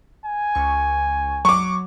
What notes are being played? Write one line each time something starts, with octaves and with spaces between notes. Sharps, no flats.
G#5
C#2 C#6
F#3 C#6 D6